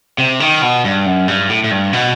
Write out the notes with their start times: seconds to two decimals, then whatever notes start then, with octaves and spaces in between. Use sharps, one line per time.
0.18 C3
0.40 D#3
0.62 B2
0.84 G2
1.06 F#2
1.28 G2
1.49 A2
1.64 A2
1.71 G2
1.93 B2